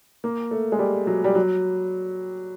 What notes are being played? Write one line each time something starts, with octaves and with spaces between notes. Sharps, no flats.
A#3
A3
G#3
G3
F#3
G3
F#3